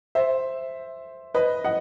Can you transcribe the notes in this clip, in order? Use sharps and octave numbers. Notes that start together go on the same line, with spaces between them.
C5 E5
B4 D#5
D#5 F#5